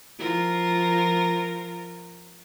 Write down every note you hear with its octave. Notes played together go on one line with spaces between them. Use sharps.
F3 F4 A#4